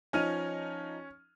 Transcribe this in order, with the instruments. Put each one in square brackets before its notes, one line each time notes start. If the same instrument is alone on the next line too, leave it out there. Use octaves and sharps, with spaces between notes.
[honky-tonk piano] F3 D#4 [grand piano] C#4 F6 D#7